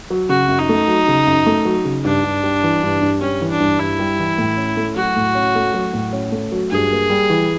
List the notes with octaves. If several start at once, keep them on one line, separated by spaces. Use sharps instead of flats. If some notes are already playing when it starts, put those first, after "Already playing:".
F#3
C#3 F#4
F#2
D#4
A3
F#3
C#3
F#2
A3
F#3
C#3
G2 D4
G2
G3
E3
G2
G2
G3 C#4
E3
D4
G2
G2 E4
G3
E3
A2
C#4
A3
F#3 F#4
A2
C#4
A3
F#3
A2
C#4
A3
F#3
G2 G#4
A#3
G3
E3